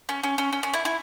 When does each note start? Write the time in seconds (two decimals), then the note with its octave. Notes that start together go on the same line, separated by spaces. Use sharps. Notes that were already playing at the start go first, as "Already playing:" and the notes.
0.09 C#4
0.23 C#4
0.38 C#4
0.53 C#4
0.63 C#4
0.74 E4
0.85 E4